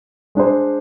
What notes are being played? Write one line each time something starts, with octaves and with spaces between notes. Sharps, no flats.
G#3 D4 G#4 C5